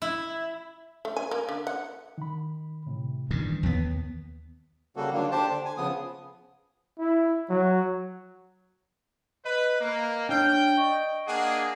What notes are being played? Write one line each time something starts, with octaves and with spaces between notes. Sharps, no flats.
E4
A3
G#5
A#3
D3
F#5
D#3 B5
A2 C3
G2 D#3 E3
D#2 B3
C#3 G3 A#3 F#4 A4
D3 D#3 F#3 A#3 D4
D4 G4 C5 A5
D3
G#5
C#3 F3 B3 D#6
E4
F#3
B4 D#5
A#3
D4 C#5 G5 F6
D5 D#5 C#6 D7
A#3 D4 G#4 F#5 G#5